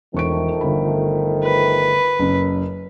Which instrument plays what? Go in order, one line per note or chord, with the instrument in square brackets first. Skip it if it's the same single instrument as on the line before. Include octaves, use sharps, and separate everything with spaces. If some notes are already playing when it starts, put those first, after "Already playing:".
[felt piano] E1 C#6 D7 [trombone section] D#3 F3 A3
[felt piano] G1 B5
[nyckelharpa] B4
[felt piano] F#1 F#2